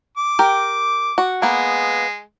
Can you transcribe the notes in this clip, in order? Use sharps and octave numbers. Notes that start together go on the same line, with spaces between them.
D6
G4 A#4
F#4
G#3 A#3 B3